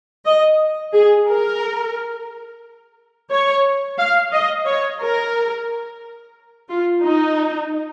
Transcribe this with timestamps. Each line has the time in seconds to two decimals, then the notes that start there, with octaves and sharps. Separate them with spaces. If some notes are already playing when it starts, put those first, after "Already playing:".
0.26 D#5
0.93 G#4
1.28 A#4
3.30 C#5
3.99 F5
4.32 D#5
4.66 C#5
5.00 A#4
6.69 F4
7.04 D#4